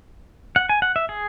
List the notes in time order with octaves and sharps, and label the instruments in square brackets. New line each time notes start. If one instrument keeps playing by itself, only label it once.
[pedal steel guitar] F#5
G#5
F#5
E5
G#4